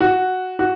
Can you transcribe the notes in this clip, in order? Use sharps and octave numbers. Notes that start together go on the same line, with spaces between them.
F#4
F#4